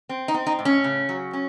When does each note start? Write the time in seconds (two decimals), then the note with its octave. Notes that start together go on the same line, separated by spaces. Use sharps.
0.09 C4
0.28 D#4
0.34 C4
0.46 D#4
0.59 A2
0.65 C#4
0.84 C#3
1.09 F#3
1.33 C#4